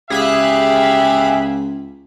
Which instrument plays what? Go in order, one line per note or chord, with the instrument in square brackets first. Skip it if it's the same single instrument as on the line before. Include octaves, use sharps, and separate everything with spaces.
[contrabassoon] C#2 [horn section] G4 E5 F5 [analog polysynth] G#4 B5 F#6